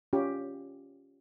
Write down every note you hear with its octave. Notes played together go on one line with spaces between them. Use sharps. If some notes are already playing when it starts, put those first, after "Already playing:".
C#4 F4 G4